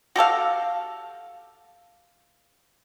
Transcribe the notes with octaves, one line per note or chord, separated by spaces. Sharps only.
F#4 G4 A4 F5